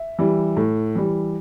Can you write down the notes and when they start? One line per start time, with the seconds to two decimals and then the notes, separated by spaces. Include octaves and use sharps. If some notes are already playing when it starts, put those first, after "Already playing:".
Already playing: E5
0.19 E3 G3
0.57 A2
0.95 E3 G3